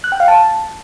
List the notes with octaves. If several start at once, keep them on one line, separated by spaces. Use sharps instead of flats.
F#6
G5
F5
A5